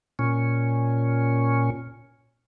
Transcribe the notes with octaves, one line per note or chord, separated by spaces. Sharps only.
A#2 C#4